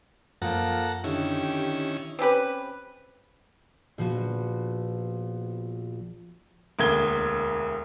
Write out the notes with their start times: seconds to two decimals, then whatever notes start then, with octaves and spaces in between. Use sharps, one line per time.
0.42 F#2 F3 A#3 A4 F#5 A#5
1.04 D3 D#3 C#4 E4 G4
2.19 C4 C#4 G4 B4
3.98 A#1 F3 B3 F#4
6.79 E1 D2 A#3 G#6 G7